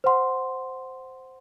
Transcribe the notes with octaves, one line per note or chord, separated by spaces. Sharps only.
C5 F#5 C6